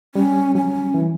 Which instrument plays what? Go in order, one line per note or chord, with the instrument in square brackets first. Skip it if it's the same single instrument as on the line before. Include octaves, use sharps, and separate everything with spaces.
[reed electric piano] G3 [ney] C#4
[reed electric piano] F#3 [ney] C#4
[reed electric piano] E3